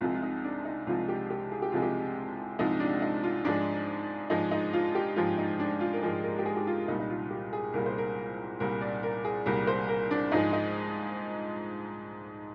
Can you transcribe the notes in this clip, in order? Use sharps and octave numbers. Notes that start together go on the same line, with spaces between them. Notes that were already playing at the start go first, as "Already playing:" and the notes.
C2 C3 F3 G#3 F4
F4
D#4
D4
D#4
C2 C3 F3 G#3 F4
G4
G4
G#4
G4
C2 C3 F3 G#3 F4
G4
C2 C3 F3 G#3 D#4
D4
D#4
F4
G#2 F3 G#3 D4
G#2 F3 G#3 D#4
D#4
F4
G4
G#2 F3 G#3 F4
D#4
D4
F4
A#4
G#2 F3 G#3 G#4
A#4
G4
G#4
G4
F4
C2 A#2 G3 D#4
D#4
F4
G4
G#4
C2 A#2 G3 A#4
C5
A#4
C2 A#2 G3 A#4
D5
A#4
G#4
C2 A#2 G3 A#4
C5
A#4
D4
G#2 F3 G#3 D#4
D#4